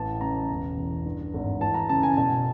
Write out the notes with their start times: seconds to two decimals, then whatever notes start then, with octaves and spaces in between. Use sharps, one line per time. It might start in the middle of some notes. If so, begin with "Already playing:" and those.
Already playing: A1 E3 A5
0.21 C#3 A#5
0.50 E1
0.77 E2
1.05 G2
1.34 G#1
1.61 E3 A5
1.74 A#5
1.89 C#3 A5
2.03 G#5
2.17 B2 A5